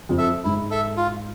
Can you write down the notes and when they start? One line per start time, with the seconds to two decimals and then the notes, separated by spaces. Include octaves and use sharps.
0.09 F2
0.18 A4 E5
0.44 G#2 E4
0.71 A4 E5
0.97 F4